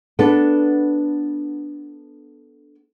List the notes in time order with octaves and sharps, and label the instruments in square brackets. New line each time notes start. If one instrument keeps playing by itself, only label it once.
[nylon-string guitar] B3 D4 A4